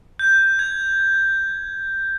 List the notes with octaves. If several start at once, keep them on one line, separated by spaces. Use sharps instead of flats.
G6
G#6